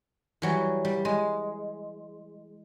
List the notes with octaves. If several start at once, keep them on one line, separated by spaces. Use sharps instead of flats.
E3 F#3 G3
G3
G#3